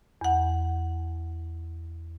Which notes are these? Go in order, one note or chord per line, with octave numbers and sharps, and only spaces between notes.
E2 F#5